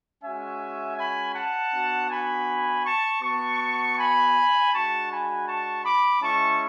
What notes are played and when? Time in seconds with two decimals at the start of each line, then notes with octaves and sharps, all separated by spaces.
0.23 G#3 C#4 F#4 E5 G#5
0.97 G#5 B5
1.35 F#5 A5
1.73 B3 D4 F#4
2.10 G#5 B5
2.85 A5 C#6
3.22 B3 F#4 A5 C#6
3.98 G#5 B5
4.72 G#3 D4 F#4 A5 C#6
5.10 G#5 B5
5.47 A5 C#6
5.84 B5 D6
6.22 G#3 C#4 E4 A5 C#6